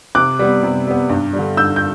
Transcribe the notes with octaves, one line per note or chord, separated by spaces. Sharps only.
C3 D6 F#6
G3 B3
C3
G3 B3
G2
G3
D3
G2 E6 G6
G6